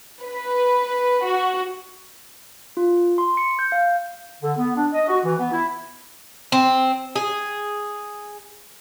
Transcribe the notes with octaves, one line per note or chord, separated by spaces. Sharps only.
B4
F#4
F4
C6
C#7
G6
F5
D3
B3
D4
D#5
F#4
E3
B3
E4
C4
G#4